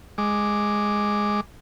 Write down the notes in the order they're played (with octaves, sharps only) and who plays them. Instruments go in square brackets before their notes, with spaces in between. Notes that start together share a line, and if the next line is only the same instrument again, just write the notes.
[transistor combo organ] G#3 D6